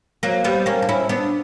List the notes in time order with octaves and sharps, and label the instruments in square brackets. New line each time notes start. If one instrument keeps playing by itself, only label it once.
[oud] F#3 A#3
G3 B3
A#3 C#4
D4
C#4 E4
B3 D4